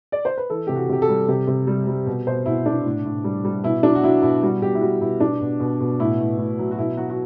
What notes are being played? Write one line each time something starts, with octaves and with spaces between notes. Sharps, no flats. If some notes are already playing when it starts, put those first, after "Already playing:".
D5
C5
B4
E3 A4
C3 G4
F#4
C3 G4
A4
G3
C3 G4
C3
G3
G3
B2
B2 C5
B2 E4
B2 D4
A2
A2
G3
G3
B2 E4
F#3 D4
F#4
F#3 E4
B2 E4
G3 F#4
B2 G4
E4
G3 F#4
B2 E4
B2 D4
B2
B2
B2
A2 E4
A2
A2
F#3
F#4
B2 E4
F#3 F#4
F#4